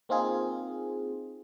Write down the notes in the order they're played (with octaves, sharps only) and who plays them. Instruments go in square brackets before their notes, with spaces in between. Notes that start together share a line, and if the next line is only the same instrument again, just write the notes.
[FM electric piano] A#3 C4 D#4 F4 G#4